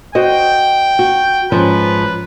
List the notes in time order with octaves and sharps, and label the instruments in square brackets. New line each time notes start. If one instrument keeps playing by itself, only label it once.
[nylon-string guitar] F#4 C5 D#5 [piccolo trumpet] G5
[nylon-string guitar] F#4
[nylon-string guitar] G#2 F3 C#4 [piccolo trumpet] B4